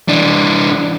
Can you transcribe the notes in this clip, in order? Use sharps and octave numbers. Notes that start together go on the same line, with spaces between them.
E3 D4